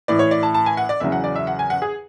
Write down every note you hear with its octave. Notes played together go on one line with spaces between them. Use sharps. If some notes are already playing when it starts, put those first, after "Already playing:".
A2 E3 D5
C#5
D5
A5
A5
G#5
F#5
D5
E2 C#3 F#3 E5
F#5
D5
E5
F#5
G#5
F#5
G#4